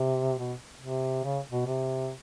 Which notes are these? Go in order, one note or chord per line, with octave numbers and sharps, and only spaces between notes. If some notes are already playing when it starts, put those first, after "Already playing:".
Already playing: C3
B2
C3
C#3
B2
C3